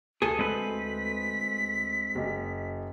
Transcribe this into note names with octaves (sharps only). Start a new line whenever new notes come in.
D2 G#4 A4
G#3 C4 B4 B6
F#1 D#5